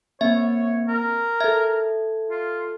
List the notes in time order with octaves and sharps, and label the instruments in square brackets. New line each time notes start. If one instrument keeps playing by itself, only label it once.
[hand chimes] A#3 C4 [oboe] C#5 [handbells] E5
[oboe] A#4
[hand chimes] A4 G#6 [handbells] E5
[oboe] F4